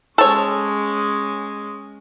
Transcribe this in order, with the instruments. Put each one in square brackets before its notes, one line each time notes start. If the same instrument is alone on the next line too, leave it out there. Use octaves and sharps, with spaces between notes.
[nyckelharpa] G#3 C#4 [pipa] A4 C#5